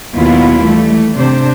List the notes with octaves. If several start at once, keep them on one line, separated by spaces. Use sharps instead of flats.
D#2 B2 F#3 B3 E4 F4
E3 G3 A3
C3 D4 C5